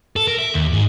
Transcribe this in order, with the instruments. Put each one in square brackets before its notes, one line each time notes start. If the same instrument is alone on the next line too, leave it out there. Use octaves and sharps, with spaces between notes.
[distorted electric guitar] A4
A#4
E5
D#2
G#2